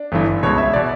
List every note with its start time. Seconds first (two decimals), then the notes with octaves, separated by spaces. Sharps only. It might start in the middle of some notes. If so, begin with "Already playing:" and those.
Already playing: D4
0.12 G1 G2 E3
0.43 C#2 B2 C#5
0.58 E5
0.74 B2 D5